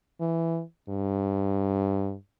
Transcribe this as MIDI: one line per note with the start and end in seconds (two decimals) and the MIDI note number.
0.21 0.62 52
0.89 2.15 43